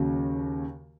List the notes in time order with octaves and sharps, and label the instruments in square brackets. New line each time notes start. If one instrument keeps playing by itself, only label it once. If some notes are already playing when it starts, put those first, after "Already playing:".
Already playing: [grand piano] D#2 C#3 F#3